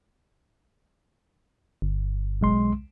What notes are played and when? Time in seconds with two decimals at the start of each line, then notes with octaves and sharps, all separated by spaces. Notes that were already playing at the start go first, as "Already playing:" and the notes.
1.82 G1
2.41 B1 G#3 C6